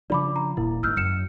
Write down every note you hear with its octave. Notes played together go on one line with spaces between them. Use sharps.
C#3 F3 D4 D5 B5 D6
A#5
D#1 A#2 A#3 E4
G#1 G#2 E6 F6 G6
F#2 F#3 F6 C#7 E7